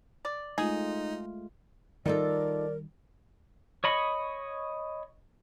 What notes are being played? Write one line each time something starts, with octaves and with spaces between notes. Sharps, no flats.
D5
G#3 A3 D#4 F4 G#4
D#3 G3 D#4 F4 A4 A#4 D5
C#5 D#5 B5 C#6